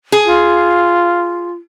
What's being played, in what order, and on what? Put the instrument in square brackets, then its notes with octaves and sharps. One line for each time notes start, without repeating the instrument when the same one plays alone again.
[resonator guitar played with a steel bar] G#4
[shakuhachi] F4